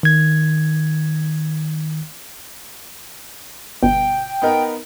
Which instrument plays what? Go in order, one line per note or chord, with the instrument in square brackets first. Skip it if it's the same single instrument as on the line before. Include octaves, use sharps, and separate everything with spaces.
[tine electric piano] D#3 G#6
[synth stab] G1 B2 [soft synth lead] G5
[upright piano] B3 D#4 A#4